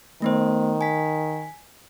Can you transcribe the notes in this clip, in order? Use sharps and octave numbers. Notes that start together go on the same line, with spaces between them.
D#3 A3 B3 C5
G#5 B6